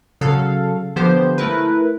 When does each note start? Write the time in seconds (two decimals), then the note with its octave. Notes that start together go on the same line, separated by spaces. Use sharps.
0.21 C#3 F#3 A4 F5
0.96 D3 F3 B3 G4 C5
1.38 A3 E4 A#4 B4